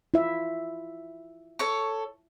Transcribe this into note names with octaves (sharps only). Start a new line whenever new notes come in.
E4 F4 E5
A4 C#5 C#6